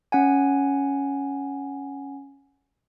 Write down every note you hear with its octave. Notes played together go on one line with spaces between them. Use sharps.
C#4 F#5 G#5